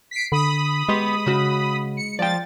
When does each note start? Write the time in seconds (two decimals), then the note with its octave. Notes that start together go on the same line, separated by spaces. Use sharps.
0.11 B6 C7 D7
0.32 D3 B5 D#6
0.89 G#3 B3 G4 C6
1.26 C#3 F#4
1.97 C#7
2.19 F3 D5 G5 A6